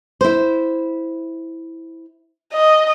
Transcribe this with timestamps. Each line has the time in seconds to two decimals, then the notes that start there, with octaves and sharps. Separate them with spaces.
0.21 E4 C5
2.53 D#5